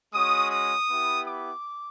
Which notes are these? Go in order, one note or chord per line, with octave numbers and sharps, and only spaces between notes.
G#3 C#4 F#4 D#6
D#6
B3 E4 G4
D6